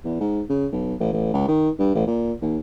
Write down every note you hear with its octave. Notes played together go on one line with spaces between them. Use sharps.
E2
G#2
C#3
B1
A1
A1
C#2
D#3
G2
A1
A#2
D#2